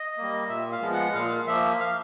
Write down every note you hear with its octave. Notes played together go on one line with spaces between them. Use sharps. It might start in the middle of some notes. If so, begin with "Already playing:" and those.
Already playing: D#5
G3 A#3
A#2 E5
F5
F3 G#3 B3
F#5
A#2 F5
F3 A#3 E5
F5